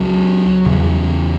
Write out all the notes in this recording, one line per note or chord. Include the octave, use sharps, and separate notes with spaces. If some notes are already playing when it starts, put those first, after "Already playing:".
Already playing: C#2 C#3 F#3
E2 C#3